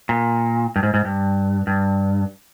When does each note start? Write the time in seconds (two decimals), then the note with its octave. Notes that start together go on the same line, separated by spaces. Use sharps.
0.09 A#2
0.76 G2
0.83 G#2
0.94 G#2
1.05 G2
1.67 G2